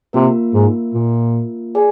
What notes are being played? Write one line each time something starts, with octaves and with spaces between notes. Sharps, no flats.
C3 A#3 F4 A#4
G#2
A#2
G#4 D5 G#5